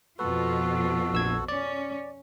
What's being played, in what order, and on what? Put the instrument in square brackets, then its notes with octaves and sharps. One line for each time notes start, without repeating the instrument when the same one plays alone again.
[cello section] F2 B2 F4 [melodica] F#4 A4 [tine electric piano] B4
[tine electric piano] A#1 E6 G#6
[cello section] C#4 [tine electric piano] D5